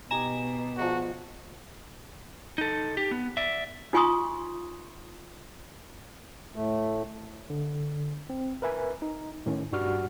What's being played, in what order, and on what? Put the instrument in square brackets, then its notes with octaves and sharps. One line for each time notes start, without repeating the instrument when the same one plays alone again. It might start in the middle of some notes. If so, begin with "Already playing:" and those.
[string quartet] B2 [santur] D#4 G4 D#6 [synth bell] G#5 A#5 E7
[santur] F3 G#3 D5 [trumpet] F#4
[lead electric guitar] D#4 A4
G4
B3
D5 E5
[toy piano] D#4 F4 G#5 C6 C#6 D#6
[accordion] A2 A3
[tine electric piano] D3
C4
A#4 B4 E5 G#5
D#4
A2 D#3 C#4
G2 G3 F#4 F#5 F6